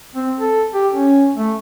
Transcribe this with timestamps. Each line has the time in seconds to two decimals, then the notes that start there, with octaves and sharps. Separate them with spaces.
0.15 C4
0.39 A4
0.74 G4
0.93 C#4
1.37 A3